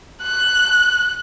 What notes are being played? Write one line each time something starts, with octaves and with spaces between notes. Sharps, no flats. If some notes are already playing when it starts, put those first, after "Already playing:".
F#6